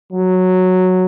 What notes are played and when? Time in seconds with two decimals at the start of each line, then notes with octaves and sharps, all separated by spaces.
0.12 F#3